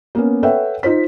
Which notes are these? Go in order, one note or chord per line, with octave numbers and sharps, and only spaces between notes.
A#3 B3 C#4
A4 B4 C#5 E5 F#5 G5
D#4 F4 C5 B6